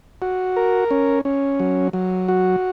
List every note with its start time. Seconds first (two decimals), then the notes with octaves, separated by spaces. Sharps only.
0.22 F#4
0.56 A#4
0.91 C#4
1.25 C#4
1.60 F#3
1.93 F#3
2.28 F#4